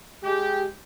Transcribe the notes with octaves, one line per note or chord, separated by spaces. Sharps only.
G#3 G4